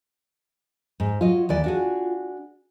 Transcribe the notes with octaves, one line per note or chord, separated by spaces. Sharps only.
G#2
F#3 F4 D#5
D#2 E3 D5
D4 F#4 G#4